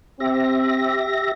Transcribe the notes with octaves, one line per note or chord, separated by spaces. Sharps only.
C4 G4 E5 A#6